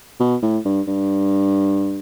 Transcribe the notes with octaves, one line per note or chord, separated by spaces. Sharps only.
B2
A2
G2
G2